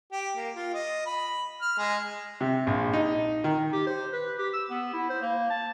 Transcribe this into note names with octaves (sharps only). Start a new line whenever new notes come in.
G4
A#3
F4
D#5
B5
F6
G#3
C3
A#1
D#4
D#3
G4
C5
B4
G4
E6
B3
E4
C5
A#3
A5